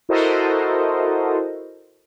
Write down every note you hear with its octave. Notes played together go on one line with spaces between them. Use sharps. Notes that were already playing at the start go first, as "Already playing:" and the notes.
E4 F#4 A4 A#4 C5 D#5